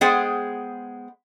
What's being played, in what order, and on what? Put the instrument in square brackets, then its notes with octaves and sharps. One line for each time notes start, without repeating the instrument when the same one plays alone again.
[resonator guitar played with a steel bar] G#3 B3 G#4 C5 F#5 G5